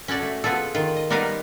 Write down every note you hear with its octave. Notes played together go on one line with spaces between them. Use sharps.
C#4 F#4 A4 D5
A3
B3 F4 G#4 A4
D#3 F4
D#5
G3 B3 D#4 A#4 F5